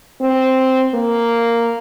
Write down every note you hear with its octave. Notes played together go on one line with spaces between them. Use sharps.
C4
A#3